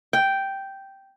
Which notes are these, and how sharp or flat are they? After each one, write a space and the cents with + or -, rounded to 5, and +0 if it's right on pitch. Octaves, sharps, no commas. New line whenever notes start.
G5 -5